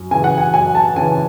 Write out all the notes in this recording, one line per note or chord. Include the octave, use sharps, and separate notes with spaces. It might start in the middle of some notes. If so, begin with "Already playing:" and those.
Already playing: F#2
C#3 E3 G#5
F#5
G#5
F#2 G#5
A5
C#3 E3 G#5